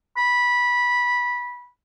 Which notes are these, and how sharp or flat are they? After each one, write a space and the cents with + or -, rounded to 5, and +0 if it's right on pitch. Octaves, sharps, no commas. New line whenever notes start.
B5 -15